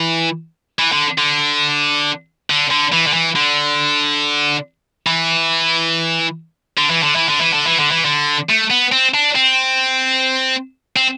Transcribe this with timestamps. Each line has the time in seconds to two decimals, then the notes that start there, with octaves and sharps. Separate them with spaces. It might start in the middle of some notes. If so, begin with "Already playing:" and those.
Already playing: E3
0.79 E3
0.92 D3
1.18 D3
2.50 D3
2.71 D3
2.93 E3
3.07 D3
3.13 E3
3.36 D3
5.07 E3
6.78 D3
6.91 E3
7.04 D3
7.16 E3
7.29 D3
7.42 E3
7.54 D3
7.67 E3
7.80 D3
7.92 E3
8.05 D3
8.49 A3
8.70 B3
8.92 C4
9.14 D4
9.35 C4
10.96 C4